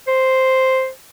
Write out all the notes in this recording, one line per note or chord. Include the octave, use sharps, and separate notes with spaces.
C5